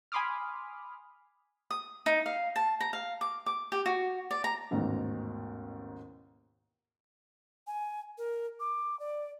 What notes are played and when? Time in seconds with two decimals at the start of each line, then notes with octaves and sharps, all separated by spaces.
0.12 G#5 B5 C6 D6 D#6 F6
1.71 D#6
2.06 D#4
2.26 F5
2.56 A5
2.80 A#5
2.93 F5
3.21 D6
3.46 D6
3.72 G4
3.86 F#4
4.31 D5
4.44 A#5
4.71 A1 D#2 G#2 B2
7.67 G#5
8.18 A#4
8.60 D6
9.00 D5